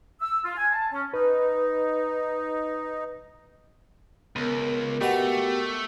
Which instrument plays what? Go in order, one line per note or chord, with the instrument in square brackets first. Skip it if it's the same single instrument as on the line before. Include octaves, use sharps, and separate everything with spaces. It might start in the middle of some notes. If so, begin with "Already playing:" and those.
[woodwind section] E6
F4
G#5
A5
C#4
[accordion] D#4 [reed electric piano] B4
[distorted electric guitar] C#2 [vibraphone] B3 A#4
[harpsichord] B2 F#5 A#5 [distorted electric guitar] A3 [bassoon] G4